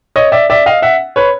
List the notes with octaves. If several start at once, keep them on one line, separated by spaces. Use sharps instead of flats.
C#5 D#5
D5 E5
D5 E5
D#5 F5
E5 F#5
B4 C#5